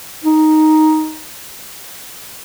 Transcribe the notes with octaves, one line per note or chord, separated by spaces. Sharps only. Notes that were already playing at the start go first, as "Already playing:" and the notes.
D#4